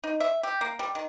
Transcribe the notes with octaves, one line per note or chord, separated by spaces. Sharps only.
D#4
E5
G4
A#3
G3
D#3